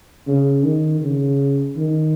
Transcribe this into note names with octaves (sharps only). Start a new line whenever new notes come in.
C#3
D#3
C#3
D#3